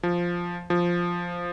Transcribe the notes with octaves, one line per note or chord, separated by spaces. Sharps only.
F3
F3